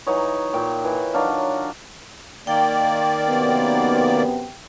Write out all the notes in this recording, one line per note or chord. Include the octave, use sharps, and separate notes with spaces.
E3 F#3 D#4 C#5
A#2 G5
E3
D#3 F#3 D4 F5
D#3 A#3 D5 G5
F#2 C3 B3